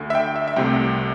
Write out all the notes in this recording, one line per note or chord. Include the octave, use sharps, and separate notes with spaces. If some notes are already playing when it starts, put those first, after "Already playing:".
Already playing: D2 D3
E5
G5
E5
E5
C2 C3 A3 G5